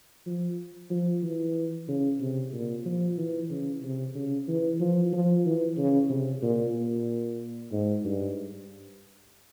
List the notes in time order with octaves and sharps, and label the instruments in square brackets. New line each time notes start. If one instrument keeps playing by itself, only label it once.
[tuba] F3
F3
E3
C#3
C3
A#2
F3
E3
C#3
C3
C#3
E3
F3
F3
E3
C#3
C3
A#2
A#2
G#2
G2